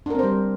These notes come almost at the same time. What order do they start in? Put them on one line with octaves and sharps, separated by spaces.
D4 A#4 C4 C5 G3